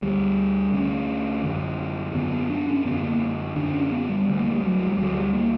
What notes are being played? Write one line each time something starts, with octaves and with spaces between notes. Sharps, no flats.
D2 D3 G3
D2 D3 C#4
F#2 D3
F#2 D3 B3
B3
D4
C#4
F#2 D3 B3
A#3
F#2 D3 D4
C#4
B3
G3
D2 D3
A#3
G3
F#3
G3
D2 D3 F#3
G3
A#3